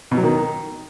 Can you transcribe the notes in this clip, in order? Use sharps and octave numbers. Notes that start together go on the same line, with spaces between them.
B2
F#3
D#3